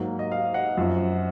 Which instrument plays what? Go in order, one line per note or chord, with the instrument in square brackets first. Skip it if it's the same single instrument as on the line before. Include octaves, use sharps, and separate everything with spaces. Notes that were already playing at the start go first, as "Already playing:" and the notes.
Already playing: [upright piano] G#2 F#3 A#3
D#5
F5
D#5 F#5
F#2 F3 C4